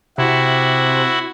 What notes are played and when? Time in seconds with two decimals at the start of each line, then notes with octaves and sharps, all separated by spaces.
0.18 C3 E4 F#4